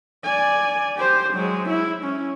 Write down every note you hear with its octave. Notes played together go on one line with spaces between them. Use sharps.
D5 G#5
G4 C5
F#3 G#3
E4
C#4